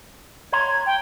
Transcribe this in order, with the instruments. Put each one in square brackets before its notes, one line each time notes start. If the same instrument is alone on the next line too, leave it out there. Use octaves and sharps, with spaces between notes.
[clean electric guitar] C#5 A#5 C6 [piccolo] G#6
[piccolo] G5